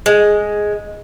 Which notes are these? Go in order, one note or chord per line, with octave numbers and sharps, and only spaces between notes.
G#3